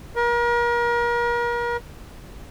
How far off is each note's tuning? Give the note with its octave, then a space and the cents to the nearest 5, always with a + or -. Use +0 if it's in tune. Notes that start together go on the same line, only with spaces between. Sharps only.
A#4 +35